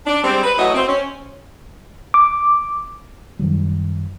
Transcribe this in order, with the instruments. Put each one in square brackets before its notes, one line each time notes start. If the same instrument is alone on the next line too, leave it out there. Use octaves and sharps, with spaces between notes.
[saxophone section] D4
G3 G#3 C4
B4
E3 F#3 A3 F#4 D#5
C4
C#4
[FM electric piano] D6
[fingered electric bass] F#2 D#3 F#3 G3